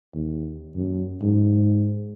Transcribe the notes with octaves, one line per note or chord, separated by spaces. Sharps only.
D#2
F#2
G#2